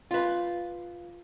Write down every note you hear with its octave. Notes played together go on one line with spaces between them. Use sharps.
F4 B4